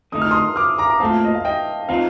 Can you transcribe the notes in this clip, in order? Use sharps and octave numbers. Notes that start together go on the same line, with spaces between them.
F2 D3 A3 D#4 D#6
F6
C6 D#6
D6 F6
A#5 D6
A#5 D6
A#2 A3 C4 F5 A5
D#5
F5
D#5 G5
F3 C4 D#4 F5